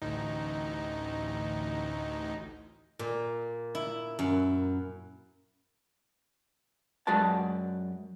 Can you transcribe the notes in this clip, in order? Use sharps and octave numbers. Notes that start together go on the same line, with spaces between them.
A1 D2 D#4
A#2
E4
F#2
F#2 G#3 F#4 B4 D5 A5